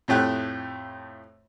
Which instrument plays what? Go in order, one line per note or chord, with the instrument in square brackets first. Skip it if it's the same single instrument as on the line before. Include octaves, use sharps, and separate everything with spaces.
[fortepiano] F2 A2 A3 G4 F#6